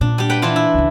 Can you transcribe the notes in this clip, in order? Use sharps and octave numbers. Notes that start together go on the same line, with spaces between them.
A#2 D4
G3 G4
B4 F#5 G5
E3 D4 F4
E4
C#2 D3